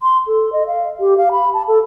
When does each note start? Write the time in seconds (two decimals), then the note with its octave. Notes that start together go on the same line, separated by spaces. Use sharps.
0.02 C6
0.27 A4
0.53 D#5
0.67 F5
1.00 G4
1.18 F5
1.32 B5
1.54 A5
1.68 A4